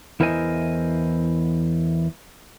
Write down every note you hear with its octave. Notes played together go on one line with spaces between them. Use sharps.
E2 E4 A#4 C5 D#5 G#5